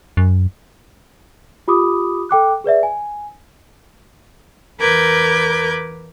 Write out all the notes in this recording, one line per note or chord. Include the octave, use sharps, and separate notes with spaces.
F#2
F4 G4 B5 D6 D#6
A4 G5 D6 F#6
G#4 B4 D5 E5
G#5
E2 A#4 B4 D6 G6 G#6